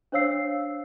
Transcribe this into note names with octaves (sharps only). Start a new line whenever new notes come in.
D4 C5 C#5 F5 E6 C7